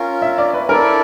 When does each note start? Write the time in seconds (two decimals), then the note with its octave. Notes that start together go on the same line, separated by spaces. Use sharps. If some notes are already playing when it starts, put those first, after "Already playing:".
Already playing: C#4 F4 A#4
0.22 E5
0.38 D5
0.53 B4
0.69 E4 A4 A#4 D5